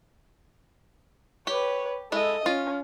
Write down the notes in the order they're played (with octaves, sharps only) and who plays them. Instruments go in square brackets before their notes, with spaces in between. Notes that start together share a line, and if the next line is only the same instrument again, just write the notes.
[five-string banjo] G4 [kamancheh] B4 C#5
[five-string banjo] G#3 E4 [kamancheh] A4 D#5
[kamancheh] C#4 [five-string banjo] F4